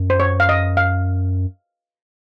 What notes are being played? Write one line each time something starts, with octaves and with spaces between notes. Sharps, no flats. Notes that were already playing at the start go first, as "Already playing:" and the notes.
Already playing: F#2
C5
C#5
F5
D#5
F5